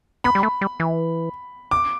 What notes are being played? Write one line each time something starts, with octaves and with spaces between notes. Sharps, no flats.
B3 B5
G3
A3
G3
E3
D6